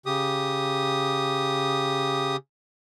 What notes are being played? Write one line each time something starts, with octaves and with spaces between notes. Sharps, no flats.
C#3 G4 D#6